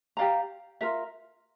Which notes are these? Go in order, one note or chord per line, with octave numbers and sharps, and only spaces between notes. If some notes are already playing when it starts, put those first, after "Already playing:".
G4 D5 F5 A#5
F4 A#4 E5